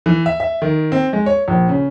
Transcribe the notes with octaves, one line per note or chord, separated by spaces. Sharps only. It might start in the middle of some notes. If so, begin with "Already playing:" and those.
E3
E5
E5
D#3
C4
G#3
C#5
A#1
C#3